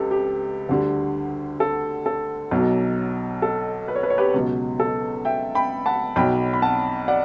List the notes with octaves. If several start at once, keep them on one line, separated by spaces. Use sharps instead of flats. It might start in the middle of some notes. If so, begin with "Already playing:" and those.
Already playing: C#2 G4 A4 B4
G4
D2 D3 G3
A4
A4
B1 B2 F#3
A4
B4
C#5
B4
C#5
G4 B4
C#2 B2 F#3
A4
E5 G5
G5 B5
F#5 A5
B1 B2 F#3 G5 B5
B5
F#5 A5
D5 F#5